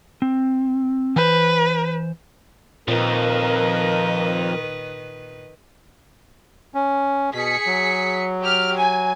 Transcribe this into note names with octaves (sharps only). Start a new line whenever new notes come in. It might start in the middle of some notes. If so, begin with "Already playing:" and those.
C4
E3 B4 C5
F2 A#2 D#3 F3 A#4 B4 D#5
C#4
B2 G#4 B6 C#7
F#3
G4 F6
G#5